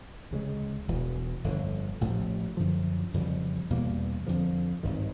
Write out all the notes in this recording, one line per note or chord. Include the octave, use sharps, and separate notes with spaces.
D2 C#3 F3 G#3
E1 E2 B2
G1 F2 D3
A1 A2 F3 A3
F#2 D3 F3
F2 C#3 E3 G3
E2 B2 G3 A#3
F2 D3 F3
G#1 G2 D#3